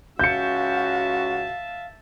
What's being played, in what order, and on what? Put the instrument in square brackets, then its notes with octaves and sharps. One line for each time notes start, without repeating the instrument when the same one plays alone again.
[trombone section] C#2 C#4 F#4 [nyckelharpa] E5 A5 [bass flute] F5 [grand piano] G6 C#7